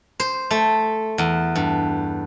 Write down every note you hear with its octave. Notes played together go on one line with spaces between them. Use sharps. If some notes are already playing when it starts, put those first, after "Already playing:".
C5
A3
E2
G2